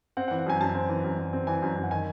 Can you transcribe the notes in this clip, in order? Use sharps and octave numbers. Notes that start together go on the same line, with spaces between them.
C4 F#5
F#5
E3
F#5
F#2 G#5
F#2 A5
C4
E3
F#2
F#2
C4
E3 G#5
F#2
F#2
F#5
D#3 G#5